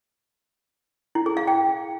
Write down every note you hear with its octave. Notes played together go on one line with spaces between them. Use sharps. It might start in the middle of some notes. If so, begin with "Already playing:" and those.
E4
G#4
F5
G5